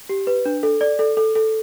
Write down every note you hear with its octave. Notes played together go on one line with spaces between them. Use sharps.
G4
B4
D4
A4
D5
A4
A4
A4